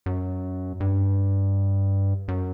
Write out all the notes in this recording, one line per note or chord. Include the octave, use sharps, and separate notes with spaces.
F#2
G2
F#2